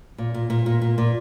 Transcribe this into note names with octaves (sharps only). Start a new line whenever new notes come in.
A#2
A#2
A#2
A#2
A#2
A#2